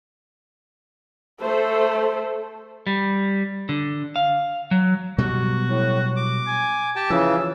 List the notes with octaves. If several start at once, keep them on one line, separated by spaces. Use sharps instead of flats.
A3 A4 C5
G3
D3
F5
F#3
B2 F#3 G3 F#4
A2
D6
G#5
G4 G5 A5
C#3 E3 F3 E6